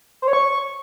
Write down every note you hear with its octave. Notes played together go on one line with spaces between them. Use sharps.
C5
C#5
C#6